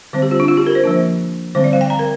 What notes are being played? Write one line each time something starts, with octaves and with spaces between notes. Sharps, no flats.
D3 G3 C4 C5
G4
F4
D4
F4
G4
A#4
C5
F3 A#3 D4
D3 G3 C4 C5
D5
F5
G5
A#5
A#4